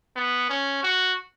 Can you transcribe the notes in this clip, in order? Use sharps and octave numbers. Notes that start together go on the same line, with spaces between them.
B3
C#4
F#4